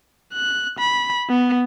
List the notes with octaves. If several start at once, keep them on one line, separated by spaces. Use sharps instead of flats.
F#6
B5
B3